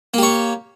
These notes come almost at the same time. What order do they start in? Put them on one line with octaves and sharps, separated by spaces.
A#3 G4 C#5